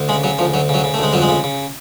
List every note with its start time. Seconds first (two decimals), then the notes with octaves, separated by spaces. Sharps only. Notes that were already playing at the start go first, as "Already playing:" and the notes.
Already playing: D2
0.09 C#3 G#3
0.24 C#3 F#3
0.39 D2 F3
0.54 D2 F#3
0.69 C#3 F#3
0.84 C#3
0.94 A3
0.99 D2 G#3
1.13 F2 F#3
1.22 G#3
1.29 C#3
1.44 C#3